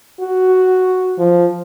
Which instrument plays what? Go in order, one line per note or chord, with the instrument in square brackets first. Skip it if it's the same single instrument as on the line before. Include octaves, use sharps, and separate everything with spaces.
[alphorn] F#4
F3